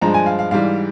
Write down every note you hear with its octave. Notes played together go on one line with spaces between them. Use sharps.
G2 F3 G#3 A#5
G#5
F5
F5
G#2 E3 G3 F5